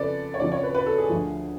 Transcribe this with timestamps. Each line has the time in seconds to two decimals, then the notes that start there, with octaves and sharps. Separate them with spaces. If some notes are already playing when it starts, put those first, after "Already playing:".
Already playing: F2 C#3 F3 A4 B4 D5
0.34 C#5
0.40 F2 C#3 F3 D5
0.52 C#5
0.63 B4
0.75 B4
0.86 A4
0.98 G#4
1.09 D2 D3 F3